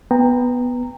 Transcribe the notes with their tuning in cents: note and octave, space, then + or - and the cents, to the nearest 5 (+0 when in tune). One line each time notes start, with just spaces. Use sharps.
B3 +0 G5 +25 A#5 -15